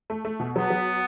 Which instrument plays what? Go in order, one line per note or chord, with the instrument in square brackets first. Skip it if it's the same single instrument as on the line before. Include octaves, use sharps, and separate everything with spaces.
[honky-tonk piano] A3
A3
B2
[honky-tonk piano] F#3 [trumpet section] B3
[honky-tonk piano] F#3